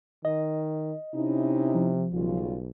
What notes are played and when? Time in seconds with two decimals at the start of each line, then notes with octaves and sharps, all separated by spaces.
0.25 D#3 D#5
1.15 C3 C#4 D#4 E4
1.75 F3
2.13 B1 C#3 G3 F4